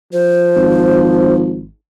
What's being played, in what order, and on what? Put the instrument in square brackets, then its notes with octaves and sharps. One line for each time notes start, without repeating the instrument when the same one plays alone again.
[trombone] F3 [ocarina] C5
[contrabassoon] G#1